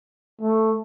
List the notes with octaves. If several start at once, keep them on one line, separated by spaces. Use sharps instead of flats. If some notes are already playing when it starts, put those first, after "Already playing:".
A3